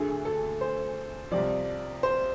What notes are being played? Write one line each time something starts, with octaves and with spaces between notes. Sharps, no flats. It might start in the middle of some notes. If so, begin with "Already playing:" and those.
Already playing: D2 D3 A3 G#4
A4
C5
C2 C3 F3 D5
C5